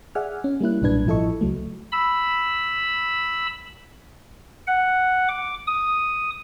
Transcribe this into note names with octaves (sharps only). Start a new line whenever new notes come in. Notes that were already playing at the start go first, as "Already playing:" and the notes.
G#4 D5 E5 F#5 G#5 F6
C#4
G3 A#3 E4 F#6
B1 G2 A#2 D4 B4 G#6
A1 F3 E4 A4 D#5 C#6
C#2 F#3 A3
B5 E6
F#5
D6
D#6